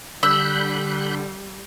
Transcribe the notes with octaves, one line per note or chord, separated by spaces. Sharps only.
D3 G3 B5 E6 F#6 G6